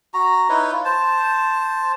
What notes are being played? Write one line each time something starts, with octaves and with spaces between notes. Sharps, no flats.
F#4 A#5
D#4 E4 B4 C#5
F4
C5 A5